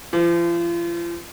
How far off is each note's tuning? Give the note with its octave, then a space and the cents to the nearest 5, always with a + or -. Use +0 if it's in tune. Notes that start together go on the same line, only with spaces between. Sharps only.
F3 -40